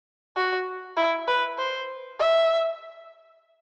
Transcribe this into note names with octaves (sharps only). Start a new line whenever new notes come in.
F#4
E4
B4
C5
E5